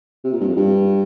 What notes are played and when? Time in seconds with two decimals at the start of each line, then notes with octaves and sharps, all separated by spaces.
0.24 C3
0.33 A#2
0.40 G2
0.49 F2
0.57 G2